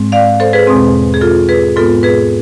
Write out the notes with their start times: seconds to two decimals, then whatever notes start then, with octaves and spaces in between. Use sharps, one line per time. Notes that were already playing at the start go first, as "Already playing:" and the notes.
Already playing: G#2 G#3 C4
0.12 D5 F5
0.40 A4 C5
0.53 G#4 B4
0.67 E2 B2 G#3 C4
1.14 G#4
1.21 F4 A4
1.49 G#4 B4
1.76 G#2 G#3 B3 F4 A4
2.03 G#4 B4